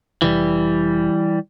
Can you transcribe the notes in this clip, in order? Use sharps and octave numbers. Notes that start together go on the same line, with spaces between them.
F1 E3 G3